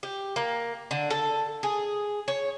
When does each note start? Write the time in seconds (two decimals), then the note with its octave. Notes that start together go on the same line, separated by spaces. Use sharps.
0.03 G4
0.36 A#3
0.91 D3
1.10 A4
1.63 G#4
2.28 C#5